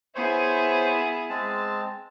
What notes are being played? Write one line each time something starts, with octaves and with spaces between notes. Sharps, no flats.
B3 E4 G#4 C5 C#5
G#3 C4 A5